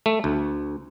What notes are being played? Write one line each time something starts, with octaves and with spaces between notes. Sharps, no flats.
A3
D2